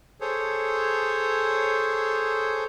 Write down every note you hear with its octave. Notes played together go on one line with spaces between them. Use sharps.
G#4 A4 C5 C#5